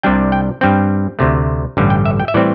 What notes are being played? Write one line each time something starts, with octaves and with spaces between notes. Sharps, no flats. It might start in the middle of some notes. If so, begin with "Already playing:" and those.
C2 C3 G3 D4 G5
G5
G2 G3 C4 G5
D2 C3 A3
A1 G2 D3 G3
G5
E5
G5
E5
A2 E3 G3 C4 D5